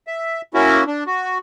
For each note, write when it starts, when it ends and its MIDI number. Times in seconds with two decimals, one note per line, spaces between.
0.07 0.42 76
0.54 0.84 58
0.54 0.84 61
0.54 0.84 64
0.54 0.84 66
0.87 1.04 62
1.07 1.38 66